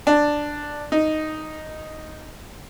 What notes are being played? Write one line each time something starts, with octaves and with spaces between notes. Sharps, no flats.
D4
D#4